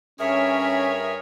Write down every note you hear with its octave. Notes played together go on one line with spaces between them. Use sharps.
G2 C#4 G#4 A#4 C#5 E5